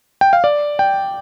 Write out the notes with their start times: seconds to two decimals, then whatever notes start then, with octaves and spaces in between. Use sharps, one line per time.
0.21 G5
0.33 F5
0.44 D5
0.79 G5